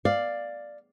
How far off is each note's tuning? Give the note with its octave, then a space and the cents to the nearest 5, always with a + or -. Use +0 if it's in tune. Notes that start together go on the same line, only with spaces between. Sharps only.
D5 +5 F5 +0